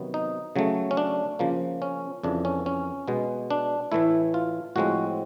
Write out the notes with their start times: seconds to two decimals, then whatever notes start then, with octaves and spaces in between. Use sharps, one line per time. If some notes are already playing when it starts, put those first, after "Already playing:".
Already playing: C3 D#3 F#3 B3
0.14 D#4
0.56 C#3 F#3 A3
0.91 C#4
0.97 D4
1.39 C#3 F3 A#3
1.82 C#4
2.24 F2 C#3 E3 D4
2.45 C#4
2.66 C#4
3.08 B2 G#3 B3
3.51 D4
3.92 A2 E3 A3 E4
4.34 F4
4.76 A2 F3 G#3 C4 F#4